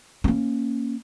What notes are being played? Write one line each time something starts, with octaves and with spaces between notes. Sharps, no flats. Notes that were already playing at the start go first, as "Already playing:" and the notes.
A#3 C#4